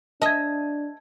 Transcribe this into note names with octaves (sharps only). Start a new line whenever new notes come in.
D4 D#5 E5 A5 G#6